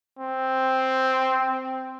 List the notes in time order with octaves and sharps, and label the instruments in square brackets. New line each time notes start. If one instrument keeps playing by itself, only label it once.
[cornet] C4